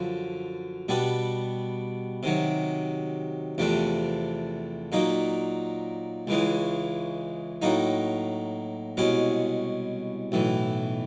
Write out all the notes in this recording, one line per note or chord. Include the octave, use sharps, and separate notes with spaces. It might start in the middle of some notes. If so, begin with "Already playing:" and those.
Already playing: F#2 D3 F3
B2 G3 B3 D4
C3 D#3 F#3
E2 C3 F3 A3 D4
A#2 F#3 A#3 D#4
C#2 C#3 E3 G#3
A2 F#3 A#3 D#4
C2 B2 G#3 C#4
B1 A2 E3